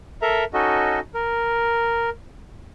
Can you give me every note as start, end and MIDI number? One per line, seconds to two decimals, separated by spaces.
0.22 0.44 69
0.22 0.44 70
0.22 0.44 76
0.22 0.44 82
0.54 1.00 61
0.54 1.00 63
0.54 1.00 66
0.54 1.00 69
0.54 1.00 75
1.14 2.10 70